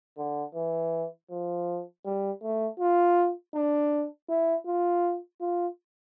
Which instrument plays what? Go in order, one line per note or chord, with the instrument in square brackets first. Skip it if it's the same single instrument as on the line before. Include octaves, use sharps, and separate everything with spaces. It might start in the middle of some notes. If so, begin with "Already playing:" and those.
[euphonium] D3
E3
F3
G3
A3
F4
D4
E4
F4
F4